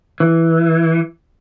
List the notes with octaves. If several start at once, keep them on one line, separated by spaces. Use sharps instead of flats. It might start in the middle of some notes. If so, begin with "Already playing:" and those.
E3